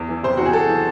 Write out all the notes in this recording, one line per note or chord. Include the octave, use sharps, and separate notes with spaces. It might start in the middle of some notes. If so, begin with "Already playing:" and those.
Already playing: E2
E3
C3 C5
E2 F#4
G#4
E2 A4
E3